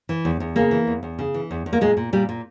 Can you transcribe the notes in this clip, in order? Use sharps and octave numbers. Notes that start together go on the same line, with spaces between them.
E3
E2
E2
C#3 A#3
E3
E2
E2
C#3
E3
E2
E2
A#3
A#2 G#3
A#2
A#2 G3
A#2